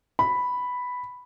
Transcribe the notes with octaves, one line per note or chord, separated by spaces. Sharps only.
B5